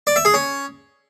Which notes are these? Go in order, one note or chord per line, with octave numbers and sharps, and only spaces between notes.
D5
E5
G#4
C#4